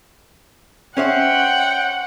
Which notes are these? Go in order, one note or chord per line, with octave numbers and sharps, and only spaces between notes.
C#4 C5 E5 F#5 G5